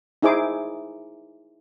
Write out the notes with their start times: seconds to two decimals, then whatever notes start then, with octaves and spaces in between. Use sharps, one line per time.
0.22 D#4 E4 G#4 C5 D6